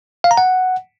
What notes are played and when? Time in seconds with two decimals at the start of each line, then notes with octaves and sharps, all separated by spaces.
0.24 F5
0.31 A#5
0.37 F#5